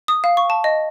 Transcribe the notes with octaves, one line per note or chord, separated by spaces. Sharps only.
D#6
F5
C#6
A5
D#5